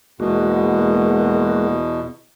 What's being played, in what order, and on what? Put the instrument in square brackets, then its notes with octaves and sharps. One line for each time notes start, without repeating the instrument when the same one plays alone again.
[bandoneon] E2 B2 [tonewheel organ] G#3 A#3 F#4